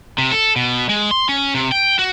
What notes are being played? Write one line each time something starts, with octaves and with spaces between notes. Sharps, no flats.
C3
A4
B2
G#3
C6
C#4
C3
G5
F#4